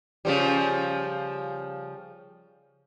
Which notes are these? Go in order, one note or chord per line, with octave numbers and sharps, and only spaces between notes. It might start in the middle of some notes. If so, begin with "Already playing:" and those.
C#3 F3 G3